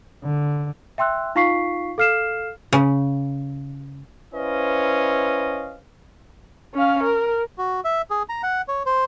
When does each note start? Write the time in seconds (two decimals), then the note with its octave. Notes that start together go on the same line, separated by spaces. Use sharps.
0.25 D3
0.98 E5 G5 C6 E6 F#6
1.35 D#4 F4 F5 C#6 B6 C7
1.98 A4 F5 F6 C7 E7
2.73 C#3
4.33 C#4 E4 B4 C5 D#5 F5
6.74 C#4 F5
7.03 A#4
7.58 F#4
7.85 E5
8.10 G#4
8.29 A#5
8.43 F#5
8.68 C#5
8.86 C5